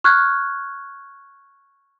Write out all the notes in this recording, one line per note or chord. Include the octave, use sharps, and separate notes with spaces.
C#6 F6 F#6 G#6